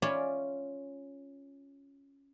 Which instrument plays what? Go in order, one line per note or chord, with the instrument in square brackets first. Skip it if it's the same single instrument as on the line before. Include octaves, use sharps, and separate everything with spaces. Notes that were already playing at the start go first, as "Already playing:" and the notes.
[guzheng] C#4 F4 D5 E5 G#5 B5